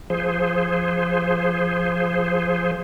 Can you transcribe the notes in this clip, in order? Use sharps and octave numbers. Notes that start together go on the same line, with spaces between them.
F3 G#4 C5